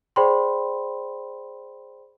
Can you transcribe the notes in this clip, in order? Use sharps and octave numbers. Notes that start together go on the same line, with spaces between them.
G#4 C5 D5 G5 B5 C6